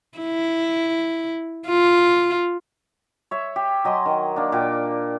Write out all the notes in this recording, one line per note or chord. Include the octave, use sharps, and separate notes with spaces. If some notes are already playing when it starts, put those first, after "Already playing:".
E4
F4
C#5 E5
G4
F#3 D#5 G#5 C6
D#3
A#3 D4
A#2 G5 D6